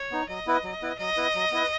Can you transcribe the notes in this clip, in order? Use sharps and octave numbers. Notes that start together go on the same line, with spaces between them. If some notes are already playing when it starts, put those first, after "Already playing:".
Already playing: C#5
B3 D#4
F#3 D#5
B3 E4 B4
F#3
B3 E4 B4
F#3 D#5
B3 E4 B4
F#3
B3 E4 B4